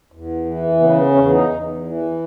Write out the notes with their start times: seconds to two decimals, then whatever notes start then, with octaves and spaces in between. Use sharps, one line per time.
0.12 E2
0.45 E3
0.80 C#3 B3
0.97 B3
1.14 E2 C#4
1.32 D#4
1.49 E2
1.85 E3